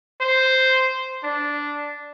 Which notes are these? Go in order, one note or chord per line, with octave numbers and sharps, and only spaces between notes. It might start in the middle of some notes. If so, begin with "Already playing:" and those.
C5
D4